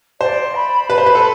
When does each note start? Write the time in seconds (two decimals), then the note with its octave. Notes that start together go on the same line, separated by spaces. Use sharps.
0.21 C5 D5
0.55 B5
0.90 B4 B5
0.98 C5
1.06 B4
1.15 A4